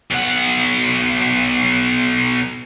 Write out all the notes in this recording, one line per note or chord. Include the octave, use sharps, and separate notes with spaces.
B1 F#5